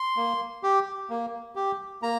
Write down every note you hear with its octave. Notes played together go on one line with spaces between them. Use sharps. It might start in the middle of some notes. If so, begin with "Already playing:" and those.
Already playing: C6
A#3
G4
A#3
G4
A#3 A#5